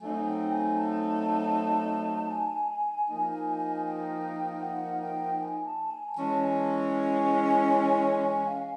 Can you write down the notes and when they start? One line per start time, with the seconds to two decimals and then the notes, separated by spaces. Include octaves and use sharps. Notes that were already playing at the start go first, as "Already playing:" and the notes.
0.01 F#3 A3 C4 D#4 G#5
0.27 G5
0.52 G#5
0.78 A5
2.31 G#5
3.08 F3 A#3 D#4
3.86 G5
4.62 F#5
5.01 G5
5.40 G#5
5.65 A5
5.91 G#5
6.17 E3 G#3 C#4 A5
6.42 G#5
6.94 G#5
8.47 F5